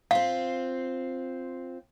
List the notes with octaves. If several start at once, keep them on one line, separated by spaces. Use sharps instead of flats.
C4 F4 F5